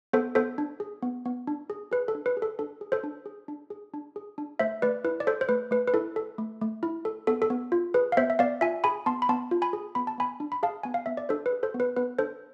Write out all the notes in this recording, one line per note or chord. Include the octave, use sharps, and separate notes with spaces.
B3 A4 C5
B3 A4 C5
D4
G#4
B3
B3
D4
G#4
G#4 B4
A4
D4
B4
G#4
A4
D4 A4
G#4
A4 C5
D4
G#4
D4
G#4
D4
G#4
D4
A3 C5 E5
A3 B4 D5
E4 B4
D5
A4 C5
C5
A3 B4
A3 B4
B4
E4 A4
A4
A3
A3
E4
A4
B3 A4
A4
B3
F4
G#4 B4
F5
B3 C5 E5
E5
B3 D5 F5
F4 E5 G#5
G#4 G#5 B5
B3 A5 C6
B5
B3 A5 C6
F4
G#5 B5
G#4
B3 B5
A5
B3 G#5 B5
D4
B5
G#4 F5 A5
B3 G#5
F5
B3 E5
D5
D4 A4 C5
B4
G#4
A4 C5
B3
B4
B3 B4
D4 A4 C5